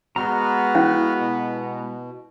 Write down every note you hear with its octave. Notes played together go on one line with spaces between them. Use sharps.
G#3 B3 F#4 A#5 F6
C#4 E4 F5
B2